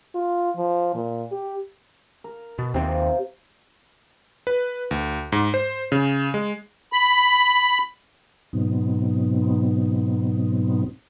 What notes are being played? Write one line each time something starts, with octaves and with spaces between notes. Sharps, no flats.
F4
F3
A#2
G4
A#4
B2
D#2 C3 C4 D#4 F4
B4
D2
G#2
C5
C#3
G#3
B5
G#2 B2 F#3 B3 C4 D#4